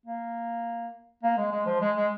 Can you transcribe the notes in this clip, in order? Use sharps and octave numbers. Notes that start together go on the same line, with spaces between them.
A#3
A#3
G#3
G#3
F3
G#3
G#3